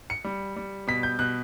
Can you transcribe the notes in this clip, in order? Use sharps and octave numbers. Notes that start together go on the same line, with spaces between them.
C#7
G3
G3
B2 B6
G6
B2 F#6